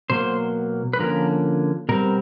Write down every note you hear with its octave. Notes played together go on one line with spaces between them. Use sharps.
B2 F#3 A#3 C5
B4
D3 F3 A#3 C#4 A#4
B2 G3 C4 A#4